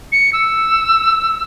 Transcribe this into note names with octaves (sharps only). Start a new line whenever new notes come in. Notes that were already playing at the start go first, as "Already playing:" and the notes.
C#7
E6